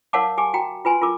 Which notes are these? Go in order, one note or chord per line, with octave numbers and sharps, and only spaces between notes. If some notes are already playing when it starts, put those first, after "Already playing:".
A#4 C#5 F5 F#5 A5 D6
G4 G#5 D6
F#4 G5 A#5
F4 B4 G#5 C6
F4 A#4 D6